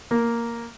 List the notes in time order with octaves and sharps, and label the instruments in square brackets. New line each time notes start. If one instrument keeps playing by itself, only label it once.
[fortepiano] A#3